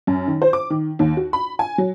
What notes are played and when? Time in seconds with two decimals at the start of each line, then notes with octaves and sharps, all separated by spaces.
0.07 F#2
0.28 D#3
0.42 C5
0.53 D6
0.70 D#3
0.99 D#2
1.17 F#4
1.33 B5
1.59 G#5
1.78 F#3